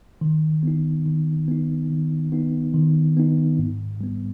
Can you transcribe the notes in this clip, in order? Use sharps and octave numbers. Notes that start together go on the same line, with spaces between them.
D#3
B3 D#4
D#3
B3 D#4
D#3
B3 D#4
D#3
B3 D#4
G#2
G3 B3